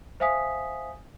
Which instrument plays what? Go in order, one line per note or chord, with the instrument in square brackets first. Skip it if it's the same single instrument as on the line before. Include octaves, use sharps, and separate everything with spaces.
[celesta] C5 E5 F5 G#5 D#6 B6